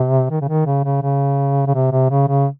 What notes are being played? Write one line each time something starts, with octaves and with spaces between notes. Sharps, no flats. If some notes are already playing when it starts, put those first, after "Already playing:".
Already playing: C3
D#3
C#3
D#3
C#3
C#3
C#3
C#3
C3
C3
C#3
C#3